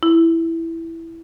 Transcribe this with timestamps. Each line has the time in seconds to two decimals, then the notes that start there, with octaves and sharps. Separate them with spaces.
0.03 E4